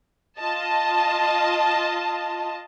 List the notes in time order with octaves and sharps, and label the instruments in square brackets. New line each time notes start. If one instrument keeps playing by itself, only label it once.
[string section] F4 D#5 A5